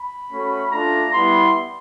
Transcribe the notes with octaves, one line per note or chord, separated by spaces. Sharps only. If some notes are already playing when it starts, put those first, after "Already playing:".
Already playing: B5
A3 C#4 F#4
A3 D4 F4 A#5
G3 B3 E4 C6